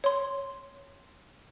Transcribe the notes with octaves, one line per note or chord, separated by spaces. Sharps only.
C#5 C6